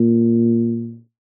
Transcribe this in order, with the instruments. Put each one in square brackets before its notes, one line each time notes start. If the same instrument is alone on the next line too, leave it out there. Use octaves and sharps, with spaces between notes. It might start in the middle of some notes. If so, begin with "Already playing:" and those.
Already playing: [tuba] A#2